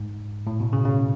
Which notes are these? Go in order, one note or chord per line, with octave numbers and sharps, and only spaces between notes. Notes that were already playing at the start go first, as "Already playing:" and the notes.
Already playing: G#2
A2
B2
C#3
C#3